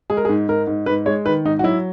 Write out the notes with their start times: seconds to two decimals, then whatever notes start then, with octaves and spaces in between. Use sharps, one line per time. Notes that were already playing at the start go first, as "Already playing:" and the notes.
0.10 G#3 G#4
0.17 A#4
0.25 G#4
0.29 G#2
0.48 G#2 A#4
0.67 G#2
0.86 G#2 B4
1.06 G#3 C#5
1.25 D#3 B4
1.45 G#2 D#4
1.59 F#4
1.64 F#3 E4